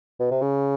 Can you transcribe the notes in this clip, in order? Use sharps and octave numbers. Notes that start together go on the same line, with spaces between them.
B2
C3
C#3